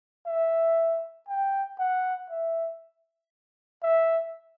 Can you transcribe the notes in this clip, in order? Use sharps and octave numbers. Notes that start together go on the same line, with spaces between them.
E5
G5
F#5
E5
E5